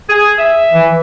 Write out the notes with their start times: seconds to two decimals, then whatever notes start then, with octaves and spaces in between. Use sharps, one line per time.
0.09 G#4
0.38 E5
0.73 E3